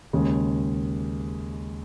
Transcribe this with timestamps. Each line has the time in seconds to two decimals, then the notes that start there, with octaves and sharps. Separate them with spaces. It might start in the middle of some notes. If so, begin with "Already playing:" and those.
0.13 D#2 C#3 G#3